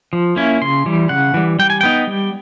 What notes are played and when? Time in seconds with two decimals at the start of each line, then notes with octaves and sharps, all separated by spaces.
0.13 F3
0.36 A#3 C#4 E4
0.61 C#3 C6
0.86 E3 G3
1.09 C#3 F#5
1.34 E3 G3
1.59 G3 G5
1.70 G#5
1.81 B3 D#4 G5
2.07 G3